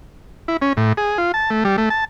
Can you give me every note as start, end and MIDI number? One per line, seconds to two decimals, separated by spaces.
0.48 0.57 64
0.62 0.73 61
0.77 0.93 45
0.97 1.18 68
1.18 1.32 65
1.34 1.50 81
1.50 1.64 57
1.65 1.76 55
1.78 1.89 57
1.90 2.05 81